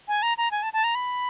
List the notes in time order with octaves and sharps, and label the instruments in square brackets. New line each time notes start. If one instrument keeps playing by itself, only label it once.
[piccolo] G#5
A#5
A#5
G#5
A5
A5
A#5
B5